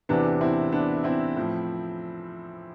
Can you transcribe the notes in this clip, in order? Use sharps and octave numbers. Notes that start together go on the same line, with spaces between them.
E2 C3 E3 B3 D4
C4 E4
B3 D4
C4 E4
A2 F3